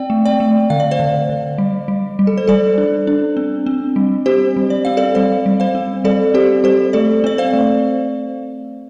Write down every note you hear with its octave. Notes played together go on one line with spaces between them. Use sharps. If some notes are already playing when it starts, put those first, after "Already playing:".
Already playing: C4 D5 G5
A3
D5 G5
A3
D3 F5
D5
C5 F5
D3
D3
G3
G3
G3
A4
C5
G3 A4 D5
D4
D4
C4
C4
G3
C4 G4 C5
G3
D5
C4 F5
A4 D5
G3 C5 F5
G3
C5 F5
C4
G3 A4 D5
C4 G4 C5
G3 G4 C5
A3 A4 D5
C4 D5
C5 F5
A3